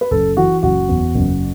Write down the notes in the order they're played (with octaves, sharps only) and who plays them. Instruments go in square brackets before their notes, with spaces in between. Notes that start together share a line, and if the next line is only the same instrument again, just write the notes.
[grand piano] B4
F#1 A4
E3 F#4
F#1 F#4
E2
F#1